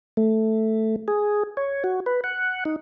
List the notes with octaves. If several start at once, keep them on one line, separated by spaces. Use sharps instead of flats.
A3
G#4
C#5
F#4
B4
F#5
D#4